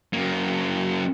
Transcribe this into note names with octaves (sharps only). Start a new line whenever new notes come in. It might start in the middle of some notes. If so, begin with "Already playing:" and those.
F#2 A#3